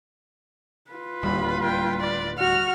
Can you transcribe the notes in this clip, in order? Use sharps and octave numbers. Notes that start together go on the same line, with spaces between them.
F4 B4
D1 D#2 G3 B5
G5
D5
F#4 F6